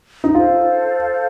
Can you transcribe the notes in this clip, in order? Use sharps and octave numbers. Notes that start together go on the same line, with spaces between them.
D#4
F4 A4 C5 F5